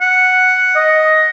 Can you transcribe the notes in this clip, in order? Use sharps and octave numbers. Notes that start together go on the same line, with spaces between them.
F#5
D#5